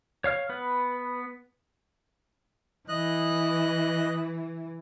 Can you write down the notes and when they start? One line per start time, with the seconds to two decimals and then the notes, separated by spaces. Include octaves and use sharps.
0.24 C#5 F5 F6
0.49 B3 B4
2.89 E3 D#5 F#6